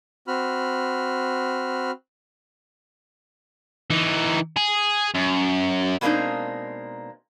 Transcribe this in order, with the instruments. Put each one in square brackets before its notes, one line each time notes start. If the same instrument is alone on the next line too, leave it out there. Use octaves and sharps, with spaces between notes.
[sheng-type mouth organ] C4 F#4 B5 F6
[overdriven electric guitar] E3 D#4
G#4
F#2
[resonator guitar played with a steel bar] B2 G#3 A#3 C4 D4 D#4